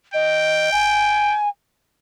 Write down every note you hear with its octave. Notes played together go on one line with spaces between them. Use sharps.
D#5 G5
G#5